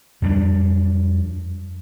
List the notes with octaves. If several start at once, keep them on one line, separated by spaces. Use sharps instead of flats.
F2 G3 C4 D4